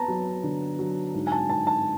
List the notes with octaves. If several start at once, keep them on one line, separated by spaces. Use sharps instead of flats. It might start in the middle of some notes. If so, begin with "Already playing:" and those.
Already playing: B3 A5 A#5
F#3
D3
F#3
G#2
G#5
A5
G#2 A5
A5